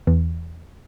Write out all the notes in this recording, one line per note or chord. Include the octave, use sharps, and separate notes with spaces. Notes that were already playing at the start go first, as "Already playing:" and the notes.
E2 E3